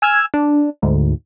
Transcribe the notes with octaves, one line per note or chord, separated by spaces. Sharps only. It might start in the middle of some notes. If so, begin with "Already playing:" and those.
G#5 E6 F6 G#6
D4
D2 G#2